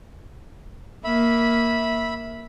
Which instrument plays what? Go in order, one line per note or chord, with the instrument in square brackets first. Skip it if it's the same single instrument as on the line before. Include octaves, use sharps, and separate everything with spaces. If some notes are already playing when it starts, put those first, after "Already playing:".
[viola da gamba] A#3 [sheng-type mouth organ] E5 B5